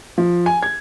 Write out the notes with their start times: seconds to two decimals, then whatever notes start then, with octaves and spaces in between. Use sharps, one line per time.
0.18 F3
0.46 G#5
0.63 G#6